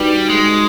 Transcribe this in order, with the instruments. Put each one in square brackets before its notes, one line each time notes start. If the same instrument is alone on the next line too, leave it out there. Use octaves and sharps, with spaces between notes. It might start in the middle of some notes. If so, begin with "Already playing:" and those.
Already playing: [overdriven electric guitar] G3 [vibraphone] D#4 F#4 B4
[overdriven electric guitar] G#3